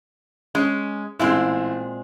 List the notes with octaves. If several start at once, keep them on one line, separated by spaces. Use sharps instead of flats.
G#3 C#4
A1 A#2 G#3 C4 E4